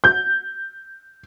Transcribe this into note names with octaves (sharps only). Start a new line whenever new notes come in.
G6